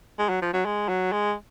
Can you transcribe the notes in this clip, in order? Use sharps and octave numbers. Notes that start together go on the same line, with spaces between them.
G#3
F#3
F3
F#3
G#3
F#3
G#3